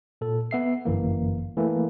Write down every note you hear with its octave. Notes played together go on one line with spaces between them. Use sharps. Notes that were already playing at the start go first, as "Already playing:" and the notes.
A#2 A4
B3 E5 C7
G1 F#2 E3 A#3
E3 A3 A#3